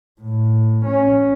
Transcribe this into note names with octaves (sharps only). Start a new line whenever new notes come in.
A2
C#4